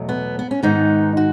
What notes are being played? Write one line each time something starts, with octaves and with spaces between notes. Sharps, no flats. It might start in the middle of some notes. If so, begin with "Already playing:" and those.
Already playing: E2 B2 F#3 A3
B3
B3
C#4
G#2 D#3 G#3 B3 D#4
F#4